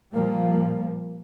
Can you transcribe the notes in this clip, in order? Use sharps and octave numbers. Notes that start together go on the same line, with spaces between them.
A#2 F3 G3 A#3